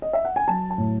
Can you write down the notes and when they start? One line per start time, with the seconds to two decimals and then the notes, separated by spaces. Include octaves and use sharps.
0.02 D#5
0.13 E5
0.25 F#5
0.36 G#5
0.48 F#3 A5
0.70 A5
0.78 A2